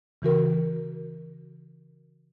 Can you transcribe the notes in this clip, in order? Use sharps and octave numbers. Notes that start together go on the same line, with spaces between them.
C#3 E3 F#4 A#4